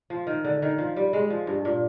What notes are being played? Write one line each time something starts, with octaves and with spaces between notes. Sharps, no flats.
F3
D#3
D3
D#3
F3
G3
G#3
F3
G2
A#2